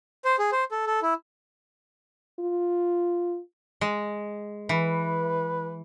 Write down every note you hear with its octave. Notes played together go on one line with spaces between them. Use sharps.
C5
G#4
C5
A4
A4
E4
F4
G#3
E3 B4